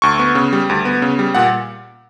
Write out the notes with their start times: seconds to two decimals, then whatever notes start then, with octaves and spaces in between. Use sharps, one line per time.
0.02 D2 C#6
0.19 B3
0.35 C#3
0.53 G3
0.69 D2
0.85 B3
1.02 C#3
1.19 G3
1.35 A#2 F#5